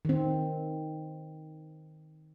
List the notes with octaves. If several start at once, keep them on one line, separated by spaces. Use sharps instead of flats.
D#3 C4